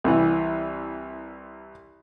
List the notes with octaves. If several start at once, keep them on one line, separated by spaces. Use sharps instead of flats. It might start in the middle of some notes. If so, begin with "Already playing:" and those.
C2 E3